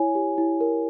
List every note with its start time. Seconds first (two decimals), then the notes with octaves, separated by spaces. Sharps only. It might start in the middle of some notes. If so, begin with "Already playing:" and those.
Already playing: E4 C#5 G#5
0.15 G4
0.38 E4
0.60 A#4